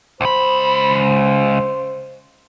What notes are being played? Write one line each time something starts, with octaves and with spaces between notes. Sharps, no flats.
C#2 C5 B5